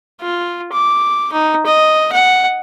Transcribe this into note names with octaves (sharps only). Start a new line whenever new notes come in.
F4
D6
D#4
D#5
F#5